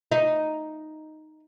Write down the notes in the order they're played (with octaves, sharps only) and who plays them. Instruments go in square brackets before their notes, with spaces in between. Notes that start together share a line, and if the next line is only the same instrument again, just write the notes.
[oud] D#4